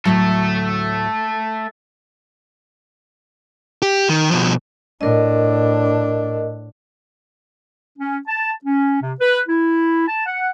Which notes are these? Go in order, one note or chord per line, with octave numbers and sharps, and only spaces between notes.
D2 A2 F#3 A3 A4
G4
D#3
B2 F3
A2 D4 A#4 D#5
C#4
A5
C#4
C3
B4
E4
A5
F#5